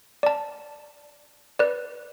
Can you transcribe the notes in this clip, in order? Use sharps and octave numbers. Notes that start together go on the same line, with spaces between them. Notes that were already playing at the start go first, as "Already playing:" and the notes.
D5 A5
B4 D5